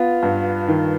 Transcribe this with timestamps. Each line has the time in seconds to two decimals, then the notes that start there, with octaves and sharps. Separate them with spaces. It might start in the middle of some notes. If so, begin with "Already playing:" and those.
Already playing: B3 F4
0.23 G2
0.68 D#3